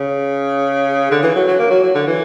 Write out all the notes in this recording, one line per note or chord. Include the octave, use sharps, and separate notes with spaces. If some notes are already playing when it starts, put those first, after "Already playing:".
Already playing: C#3
D3
E3
F#3
F#3
A#3
F#3
F#3
D3
E3